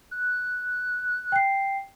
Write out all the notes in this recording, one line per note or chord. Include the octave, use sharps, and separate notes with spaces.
F#6
G5 C7